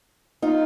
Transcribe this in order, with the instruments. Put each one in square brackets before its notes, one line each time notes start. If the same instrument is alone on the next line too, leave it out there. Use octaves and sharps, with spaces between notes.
[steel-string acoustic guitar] D#4 F4